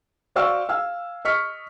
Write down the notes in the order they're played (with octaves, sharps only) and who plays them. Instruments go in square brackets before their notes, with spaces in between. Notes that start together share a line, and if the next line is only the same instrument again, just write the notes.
[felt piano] F#4 C5 D5 F5 C#6 E6
F5 G#5 E6
D#5 C#6 F6 B6 C#7